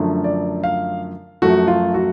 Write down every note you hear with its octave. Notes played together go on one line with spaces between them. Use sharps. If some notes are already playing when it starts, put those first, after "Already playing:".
Already playing: F#2 D3 F3 A3
D5
F5
F#2 F3 A3 F#4
F4
F#4